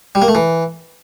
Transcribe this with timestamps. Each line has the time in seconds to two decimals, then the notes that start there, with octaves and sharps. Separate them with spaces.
0.15 G3
0.22 A#3
0.28 A3
0.35 E3